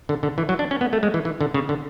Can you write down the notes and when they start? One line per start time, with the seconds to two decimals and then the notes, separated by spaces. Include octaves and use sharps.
0.09 D3
0.23 D3
0.38 E3
0.49 F#3
0.59 D4
0.71 C#4
0.81 B3
0.93 A3
1.03 G#3
1.14 E3
1.25 E3
1.41 D3
1.54 C#3
1.69 D3